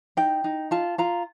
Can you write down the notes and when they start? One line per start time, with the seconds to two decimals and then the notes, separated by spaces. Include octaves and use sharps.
0.17 D#4 G5
0.44 D#4
0.71 F4 A5
0.98 F4 A#5